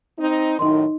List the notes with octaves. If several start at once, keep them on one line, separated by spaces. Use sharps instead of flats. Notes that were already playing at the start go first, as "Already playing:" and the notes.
C4 D#4
F#2 A2 D#3 D#4 D#5 C6